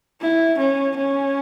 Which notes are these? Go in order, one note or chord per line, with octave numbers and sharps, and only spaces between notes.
E4
C#4
C#4